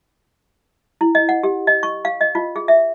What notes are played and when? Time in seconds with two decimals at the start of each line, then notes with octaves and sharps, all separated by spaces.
1.01 E4
1.15 D#5
1.29 F#5
1.43 G4
1.67 D#5
1.83 C#6
2.05 F5
2.21 D#5
2.35 F4
2.56 G#4
2.68 E5